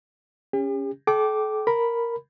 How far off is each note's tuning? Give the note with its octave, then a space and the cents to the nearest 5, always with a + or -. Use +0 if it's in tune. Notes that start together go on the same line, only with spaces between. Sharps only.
C#4 +0 G4 +45
A4 -40 G5 -20 D6 +0
A#4 +0 B5 +0